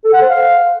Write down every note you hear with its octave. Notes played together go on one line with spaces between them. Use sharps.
A4
F#5
C5
F5